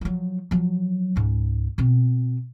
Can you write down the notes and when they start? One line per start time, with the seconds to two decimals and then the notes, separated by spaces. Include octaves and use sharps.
0.01 F3 F#3
0.51 F3 F#3
1.16 C#2 G#2
1.78 B2 C4